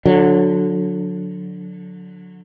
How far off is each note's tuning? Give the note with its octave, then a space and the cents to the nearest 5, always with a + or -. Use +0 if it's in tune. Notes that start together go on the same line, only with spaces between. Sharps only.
D3 +0 F#3 -25